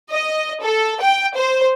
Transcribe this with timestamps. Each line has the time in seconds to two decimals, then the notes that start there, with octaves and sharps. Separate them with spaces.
0.11 D#5
0.62 A4
1.01 G5
1.36 C5